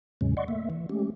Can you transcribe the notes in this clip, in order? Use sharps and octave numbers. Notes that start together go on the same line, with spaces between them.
E2 A2 C#3 F#3 G#3 C#4
D5 D#5 F#5 C6 C#6
A3 A#3 E5
E3
G#3 A3 C#4 G4